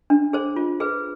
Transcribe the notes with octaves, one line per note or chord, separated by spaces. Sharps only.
D4
G#4 C5
F4
G#4 B4